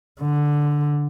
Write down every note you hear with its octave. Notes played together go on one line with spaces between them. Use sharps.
D3